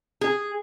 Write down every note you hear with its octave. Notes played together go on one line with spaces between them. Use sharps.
G#4